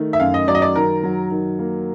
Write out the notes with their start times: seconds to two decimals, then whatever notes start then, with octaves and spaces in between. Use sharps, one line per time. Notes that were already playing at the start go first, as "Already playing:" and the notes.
Already playing: D#3 A3
0.13 E5
0.20 F#2 F5
0.34 D#5
0.48 F#3 D5
0.55 D#5
0.62 D5
0.76 D#3 A#4
1.03 F#3
1.31 D#3
1.59 A#3